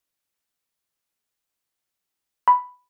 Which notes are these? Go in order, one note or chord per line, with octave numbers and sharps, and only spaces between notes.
B5